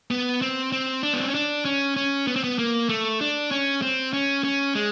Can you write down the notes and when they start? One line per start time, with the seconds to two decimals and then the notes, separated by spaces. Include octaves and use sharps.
0.11 B3
0.42 C4
0.72 C4
1.03 D4
1.13 B3
1.20 C4
1.28 C#4
1.35 D4
1.65 C#4
1.96 C#4
2.27 B3
2.36 C4
2.44 B3
2.59 A#3
2.89 A3
3.21 D4
3.51 C#4
3.82 C4
4.13 C#4
4.44 C#4
4.75 G#3